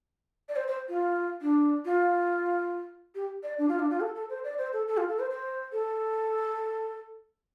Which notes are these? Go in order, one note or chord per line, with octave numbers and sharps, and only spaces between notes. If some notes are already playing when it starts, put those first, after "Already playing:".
D5
C5
C5
F4
D4
F4
G4
D5
D4
F4
D4
F4
A4
A4
C5
D5
C5
A4
A4
F4
A4
C5
C5
A4